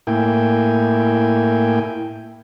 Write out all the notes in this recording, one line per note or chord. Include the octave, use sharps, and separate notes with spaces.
A2 A#3 E4 G5 G#5